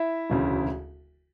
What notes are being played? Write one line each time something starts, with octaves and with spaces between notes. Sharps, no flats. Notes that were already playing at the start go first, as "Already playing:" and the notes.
Already playing: E4 E5
E1 D2 C#3